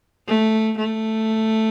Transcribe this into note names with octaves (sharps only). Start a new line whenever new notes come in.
A3
A3